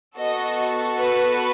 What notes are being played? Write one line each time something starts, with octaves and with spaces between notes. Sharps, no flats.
B3 F#4 A4 D#5
B4